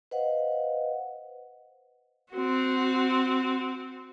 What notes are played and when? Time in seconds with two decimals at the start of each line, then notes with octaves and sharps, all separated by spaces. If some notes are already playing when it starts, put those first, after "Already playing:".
0.11 B4 C5 D#5 F5 F#5
2.31 C4 F#4